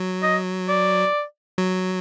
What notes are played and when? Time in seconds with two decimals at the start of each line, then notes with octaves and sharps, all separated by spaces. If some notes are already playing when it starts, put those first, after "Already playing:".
Already playing: F#3
0.23 D#5
0.68 D5
1.58 F#3